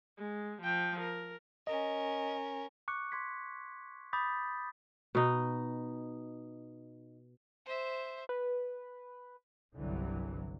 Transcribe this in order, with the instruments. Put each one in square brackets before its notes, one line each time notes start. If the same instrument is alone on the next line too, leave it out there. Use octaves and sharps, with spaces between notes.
[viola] G#3
F3 G5
A#4
[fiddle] C#4 A#4 [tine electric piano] D#5
[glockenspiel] C#6 D6 F#6 C#7
C6 D6 G#6 B6
B5 D6 D#6 G6 A6 B6
[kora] B2 D#4
[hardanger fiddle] C5 E5
[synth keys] B4
[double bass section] G1 C2 G2 D3 E3 F#3